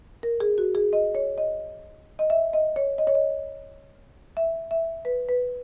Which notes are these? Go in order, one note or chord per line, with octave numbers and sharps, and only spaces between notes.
A#4
G#4
F#4
G#4
D#5
C#5
D#5
D#5
E5
D#5
C#5
D#5
C#5
D#5
E5
E5
B4
B4